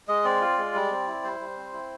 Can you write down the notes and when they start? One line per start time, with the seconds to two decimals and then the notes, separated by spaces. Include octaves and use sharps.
0.08 G#3 D#5
0.25 C4 D5
0.41 F4
0.58 G#3
0.74 G3
0.91 C4
1.07 E4
1.23 G3 C5
1.40 G3
1.57 C4
1.73 E4